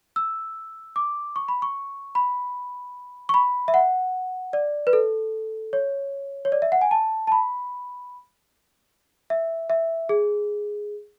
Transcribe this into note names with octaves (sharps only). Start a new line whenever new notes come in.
E6
D6
C#6
B5
C#6
B5
C#6
B5
E5
F#5
D5
B4
A4
C#5
C#5
D5
E5
F#5
G#5
A5
A5
B5
E5
E5
G#4